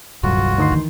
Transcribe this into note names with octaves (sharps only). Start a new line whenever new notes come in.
D#1 C2 G2 D3 F#3 F4 F#4
D2 D#3 D#4 C6
E3